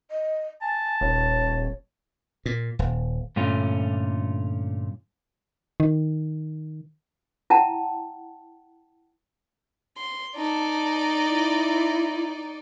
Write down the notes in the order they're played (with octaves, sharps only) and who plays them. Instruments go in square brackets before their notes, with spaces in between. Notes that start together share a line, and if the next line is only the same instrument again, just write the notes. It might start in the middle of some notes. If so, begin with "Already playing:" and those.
[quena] D#5
[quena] G#5 [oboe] A5
[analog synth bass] D#1 [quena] C#5
[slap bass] A#2
D#1
[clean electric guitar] G2 A#2 D3 A3 C#4 F4
[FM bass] D#3
[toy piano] E4 F#5 G5 A5 A#5
[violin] C6
[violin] D#4 D5 [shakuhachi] A5
[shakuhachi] E4